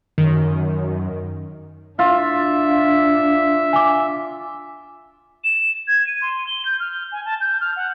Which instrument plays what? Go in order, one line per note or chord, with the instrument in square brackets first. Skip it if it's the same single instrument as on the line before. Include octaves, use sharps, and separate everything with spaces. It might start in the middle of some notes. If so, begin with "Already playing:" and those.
[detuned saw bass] F#2 [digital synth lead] D#3
[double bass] D4 [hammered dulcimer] F4 [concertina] E5
[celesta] G#5 D6
[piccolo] E7
G#6
D#7
C6
G7
G6
F6
G#5
A5
G6
F6
F#5